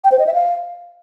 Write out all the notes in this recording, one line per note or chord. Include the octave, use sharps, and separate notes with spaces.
G5
C5
D#5
E5
F5